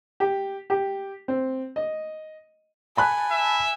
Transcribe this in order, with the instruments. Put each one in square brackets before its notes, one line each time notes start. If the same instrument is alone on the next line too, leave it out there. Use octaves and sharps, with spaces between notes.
[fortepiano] G4
G4
C4
D#5
[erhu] G#5 [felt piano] A5 B5 F#6
[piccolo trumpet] E5